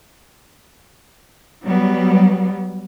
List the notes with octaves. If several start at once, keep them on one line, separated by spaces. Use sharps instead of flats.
F#3 G3 B3